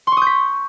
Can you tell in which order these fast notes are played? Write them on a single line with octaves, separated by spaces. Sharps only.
C6 C#6 D#6 G6 B6